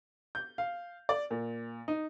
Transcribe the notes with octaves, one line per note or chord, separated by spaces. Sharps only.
G6
F5
D5
A#2
D#4